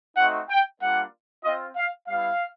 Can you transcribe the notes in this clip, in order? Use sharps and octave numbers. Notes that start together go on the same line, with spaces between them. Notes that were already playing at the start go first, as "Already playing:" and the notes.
A3 C4 D#4 F#4 F#5
G5
G3 A#3 D4 F4 F#5
C4 F4 D#5
F5
G3 B3 E4 F5